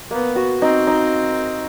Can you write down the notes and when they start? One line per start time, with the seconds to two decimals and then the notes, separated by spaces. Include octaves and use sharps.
0.11 A#3 B3
0.36 F#4
0.62 C4 D#4
0.87 D#4